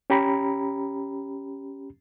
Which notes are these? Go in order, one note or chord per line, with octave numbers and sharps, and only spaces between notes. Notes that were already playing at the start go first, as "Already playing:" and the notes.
C#4 G4 A#5 B5